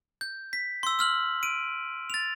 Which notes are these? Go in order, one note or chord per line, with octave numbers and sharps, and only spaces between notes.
G6
B6
C6 E6
E6 F6 F#7
D7 D#7
A6 F7